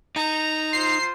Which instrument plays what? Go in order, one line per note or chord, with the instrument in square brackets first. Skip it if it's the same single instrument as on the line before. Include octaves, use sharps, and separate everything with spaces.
[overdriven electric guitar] D#4 [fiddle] A#5
[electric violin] F4 C5 [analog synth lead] C7